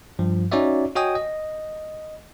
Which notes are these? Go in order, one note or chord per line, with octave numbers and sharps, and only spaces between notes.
G2 F3
C#4 D#4 F#4 C#5 D5 E5
F#4 C#5 D#5 G5 G#5 D#6
D#5